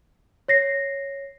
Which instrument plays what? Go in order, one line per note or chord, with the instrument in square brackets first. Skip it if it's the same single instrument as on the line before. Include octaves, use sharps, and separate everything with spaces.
[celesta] C#5 A#6 C7